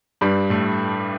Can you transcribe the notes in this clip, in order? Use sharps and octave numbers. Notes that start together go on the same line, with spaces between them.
G2 G3
A2 A3